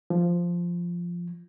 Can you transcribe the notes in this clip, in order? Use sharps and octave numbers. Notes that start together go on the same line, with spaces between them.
F3